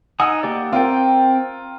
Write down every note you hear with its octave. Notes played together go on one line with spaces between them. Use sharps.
D#4 F#5 G#5 D#6 E6
A#3 G4 D5
C4 F4 A#4 G5